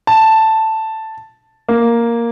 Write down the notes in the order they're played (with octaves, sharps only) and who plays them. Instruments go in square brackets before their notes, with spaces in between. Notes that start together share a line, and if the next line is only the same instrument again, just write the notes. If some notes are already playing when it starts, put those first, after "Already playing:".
[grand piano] A5
A#3